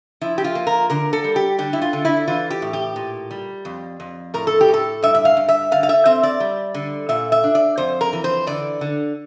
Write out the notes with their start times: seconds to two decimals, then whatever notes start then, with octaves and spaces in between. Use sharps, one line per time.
0.21 F3 E4
0.38 G4
0.44 F4
0.55 A#3
0.67 A#4
0.90 D3 A#4
1.13 A4
1.24 G3
1.36 G4
1.58 D3 G4
1.73 E4
1.82 F4
1.93 D3
2.05 E4
2.28 E3 F4
2.51 G4
2.62 A2
2.73 G4
2.96 A#2
3.31 G3
3.65 F2
4.00 F2
4.34 A2 A#4
4.47 A4
4.61 G4
4.68 A2
4.74 A4
5.03 G2 E5
5.15 E5
5.25 F5
5.37 G2
5.49 E5
5.72 D3 F5
5.83 F5
5.89 E5
6.06 C4 E5
6.23 D5
6.40 G3
6.74 D3
7.09 A#2 E5
7.32 E5
7.44 D4
7.55 D5
7.78 F2 C5
8.01 A#4
8.13 E3
8.24 C5
8.47 D3 D5
8.81 D3